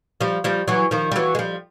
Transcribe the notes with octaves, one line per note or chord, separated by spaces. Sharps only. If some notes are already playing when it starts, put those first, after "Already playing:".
F3 G3
F3 G3
E3 F#3
D#3 F3
G3
E3 F#3
G#3
F3 G3